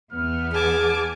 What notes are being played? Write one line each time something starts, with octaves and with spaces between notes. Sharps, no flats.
E2 B3 F6
G#4 G#5 A5 D6